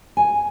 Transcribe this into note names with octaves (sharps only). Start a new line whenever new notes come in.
G#5